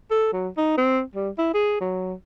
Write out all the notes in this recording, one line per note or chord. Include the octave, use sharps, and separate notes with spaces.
A4
F#3
D#4
C4
G3
E4
G#4
F#3